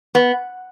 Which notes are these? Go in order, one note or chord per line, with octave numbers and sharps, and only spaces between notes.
B3